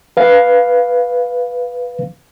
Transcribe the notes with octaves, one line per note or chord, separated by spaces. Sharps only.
B4 F5